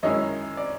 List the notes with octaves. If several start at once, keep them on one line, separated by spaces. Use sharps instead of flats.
F#2 D#3 G#3 C#4 E4 C#5 D#5
D5